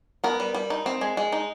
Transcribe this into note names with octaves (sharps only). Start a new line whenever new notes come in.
B3 A#4
G3
G3
D#4
C4
G#3
G#3
D#4